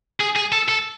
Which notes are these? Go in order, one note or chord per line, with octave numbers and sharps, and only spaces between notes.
G#4
G#4
A4
A4